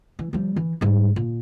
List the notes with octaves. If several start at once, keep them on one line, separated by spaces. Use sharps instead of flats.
E3
F3 G3
E3
G#2 G3
A#2